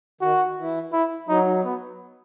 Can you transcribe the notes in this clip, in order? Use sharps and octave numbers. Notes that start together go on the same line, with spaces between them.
D#3 F#4
E3
E4
F#3 D#4
B3